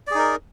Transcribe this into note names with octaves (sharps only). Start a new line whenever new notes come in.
D#4 G#4 A#4 D5